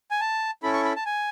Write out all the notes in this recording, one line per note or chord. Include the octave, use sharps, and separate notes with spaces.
G#5
A5
C#4 E4 A4 B5
C#6
B5
A5
G#5